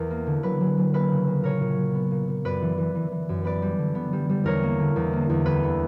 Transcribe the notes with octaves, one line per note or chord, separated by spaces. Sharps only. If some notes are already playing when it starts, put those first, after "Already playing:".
Already playing: E2 A#4
A#3
D3
F#3 B4
F#3
F#3
A#3 B4
C#3
A#3
A#2 A#4 C#5
A#2
F#3
B3
A#2
A#2
F#2 B4 D5
E3
E3
E3
E3
F#2
B3 B4 D5
G3
D3
B3
G3
G3
E2 A#4 C#5
A#3
D3
E2
A#3
E2
D2 B4
B3